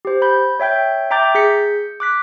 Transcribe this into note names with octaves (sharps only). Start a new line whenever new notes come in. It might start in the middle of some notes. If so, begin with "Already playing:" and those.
G4 C5
B5 G6
C#5 E5 G5 G6
E5 G5 A#5 D6 G6 A6
G#4 G6 B6 C#7
D6 F#6 B6